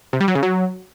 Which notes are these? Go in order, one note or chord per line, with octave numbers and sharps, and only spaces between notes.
C3
G3
F#3
C#3
F#3